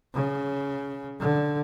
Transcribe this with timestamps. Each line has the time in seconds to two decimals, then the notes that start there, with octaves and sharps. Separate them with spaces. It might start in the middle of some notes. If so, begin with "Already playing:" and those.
0.14 C#3
1.20 D3